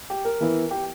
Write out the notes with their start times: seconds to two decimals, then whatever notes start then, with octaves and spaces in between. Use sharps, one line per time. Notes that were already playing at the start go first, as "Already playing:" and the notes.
0.10 G4
0.25 A#4
0.41 E3 B3 E4
0.71 G4